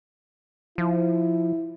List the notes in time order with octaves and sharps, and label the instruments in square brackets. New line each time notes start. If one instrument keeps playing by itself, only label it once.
[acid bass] F3 [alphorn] E4